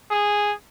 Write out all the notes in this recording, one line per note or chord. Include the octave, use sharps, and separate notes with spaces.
G#4